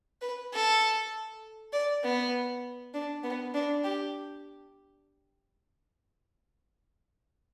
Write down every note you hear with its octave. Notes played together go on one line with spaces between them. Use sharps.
B4
A4
D5
B3
D4
B3
D4
G4